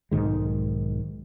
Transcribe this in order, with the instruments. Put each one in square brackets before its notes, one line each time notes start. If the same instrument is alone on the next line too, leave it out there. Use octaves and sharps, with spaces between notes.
[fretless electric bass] B1 G#2 D#3 G#3